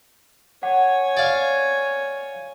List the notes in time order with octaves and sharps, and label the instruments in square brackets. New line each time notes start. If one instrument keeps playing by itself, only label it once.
[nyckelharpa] C#5 G#5 [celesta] F#5
[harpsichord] D5 F5